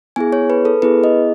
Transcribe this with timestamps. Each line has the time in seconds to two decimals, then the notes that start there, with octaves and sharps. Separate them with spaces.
0.16 B3 E4 G#4 G#5
0.33 C#5
0.50 B4
0.65 A4
0.82 B3 E4 G#4 B4
1.04 D#5